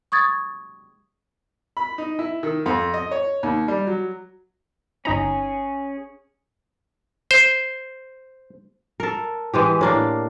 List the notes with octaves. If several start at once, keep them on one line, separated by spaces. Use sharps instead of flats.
C#6 D#6 G#6 A6
B5
D#4
E4
D#3
F2
D#5
C#5
D#2
G3
F#3
G1 C#4 D#4 G#4 A#5
C5
A4 A#4
E3 G#3 G4
A2 A#3 D4